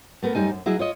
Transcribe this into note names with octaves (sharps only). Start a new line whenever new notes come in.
A3 B3 A#4
F#2 G3 D#4 G#5
F#2
F#3 E4 G#4 D#5
F4 C#5 D#5